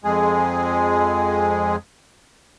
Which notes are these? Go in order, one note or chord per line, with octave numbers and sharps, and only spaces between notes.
F2 G#3 G#4